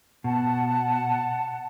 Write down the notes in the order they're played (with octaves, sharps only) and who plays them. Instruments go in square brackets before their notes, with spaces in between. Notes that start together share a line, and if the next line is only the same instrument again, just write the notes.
[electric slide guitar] B2 [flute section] F#5 A5